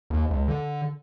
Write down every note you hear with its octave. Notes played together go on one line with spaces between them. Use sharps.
D#2
C#2
D3